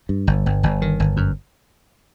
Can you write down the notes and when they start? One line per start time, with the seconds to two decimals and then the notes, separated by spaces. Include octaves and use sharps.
0.09 G2
0.27 G1
0.46 G1
0.63 G1
0.82 D#3
1.00 G1
1.17 F#2